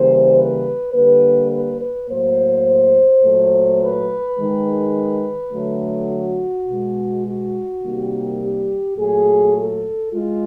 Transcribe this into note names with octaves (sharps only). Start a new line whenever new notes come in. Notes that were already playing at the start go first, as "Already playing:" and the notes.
Already playing: C#3 E3 G3 A#3 C5
B4
D3 G3 A#3 B4
B4
B4
A2 F#3 A#3 C5
A#2 F#3 A3
B4
D#3 G#3
D3 F#3 A3
F#4
B2 G#3
F#4
C3 D#3 G3 A#3
G4
A#2 F#3 A3 G#4
A4
G#3 F4